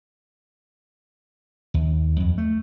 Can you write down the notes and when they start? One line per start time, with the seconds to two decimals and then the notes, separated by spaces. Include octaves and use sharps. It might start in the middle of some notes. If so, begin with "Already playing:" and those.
1.74 D#2
2.20 F2
2.38 A3